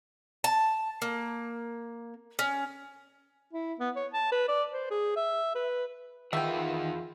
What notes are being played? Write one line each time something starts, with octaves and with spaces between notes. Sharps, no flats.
A5
A#3
C#4
E4
B3
C#5
A5
B4
D5
C5
G#4
E5
B4
D#3 E3 F4 G#4 E5 F#5 G5